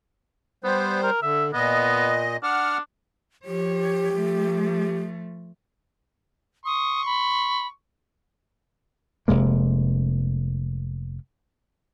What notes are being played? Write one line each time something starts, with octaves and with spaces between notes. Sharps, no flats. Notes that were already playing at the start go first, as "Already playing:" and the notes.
G3 B3 C5
A#4
D3 E5
A#2 B3 D#5
D4 F#5 F6
F3 G4 C#5
F3 A3
C6 C#6 D#6
B5
F1 C3 G#3 A#3